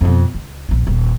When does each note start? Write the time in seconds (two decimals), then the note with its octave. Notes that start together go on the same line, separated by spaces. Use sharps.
0.01 F2 B2
0.35 C#2
0.69 A#1 F3
0.87 D#1